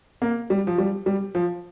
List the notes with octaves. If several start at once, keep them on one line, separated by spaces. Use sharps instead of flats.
A#3
G3
F3
G3
G3
F3